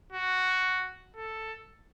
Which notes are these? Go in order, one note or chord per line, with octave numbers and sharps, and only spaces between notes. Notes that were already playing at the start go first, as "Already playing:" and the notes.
F#4
A4